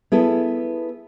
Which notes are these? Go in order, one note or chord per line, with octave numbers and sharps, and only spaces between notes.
B3 E4 G#4 A4